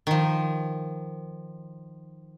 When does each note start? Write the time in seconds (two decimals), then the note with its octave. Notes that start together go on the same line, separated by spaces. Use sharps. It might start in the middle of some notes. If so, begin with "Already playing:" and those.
0.07 D#3 F3